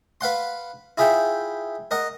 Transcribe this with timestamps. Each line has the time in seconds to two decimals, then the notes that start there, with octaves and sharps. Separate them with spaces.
0.21 B4 F5 F#5 C6
0.98 E4 F4 G#4 E5 G5
1.91 A#4 D#5 F#5